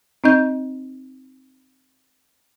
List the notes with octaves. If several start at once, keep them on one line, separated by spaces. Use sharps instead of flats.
C4 D#4 D#5 G6